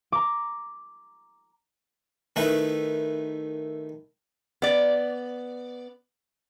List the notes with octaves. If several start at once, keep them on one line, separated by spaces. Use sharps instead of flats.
A#5 D6
D#3 A3 E4 B4
B3 D5